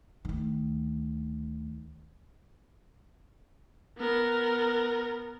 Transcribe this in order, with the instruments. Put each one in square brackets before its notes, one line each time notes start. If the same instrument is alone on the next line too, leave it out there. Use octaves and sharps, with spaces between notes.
[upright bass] D2 D#3
[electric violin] B3 A#4